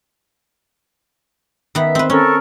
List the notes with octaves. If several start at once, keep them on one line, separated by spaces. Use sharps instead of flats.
D#3 B3 E5
C4 B4
C#4 A4 A#4 C#6